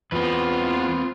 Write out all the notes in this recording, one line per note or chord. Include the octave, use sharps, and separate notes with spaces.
E2 B3 C4 F4 B4